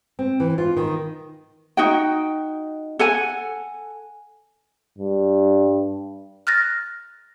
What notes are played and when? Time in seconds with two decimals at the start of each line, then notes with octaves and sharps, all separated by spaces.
0.19 C4
0.40 E3
0.58 F4
0.77 D#3
1.77 D#4 F#4 G5
2.99 A4 F#5 G#5
4.99 G2
6.47 F6 F#6 A6 A#6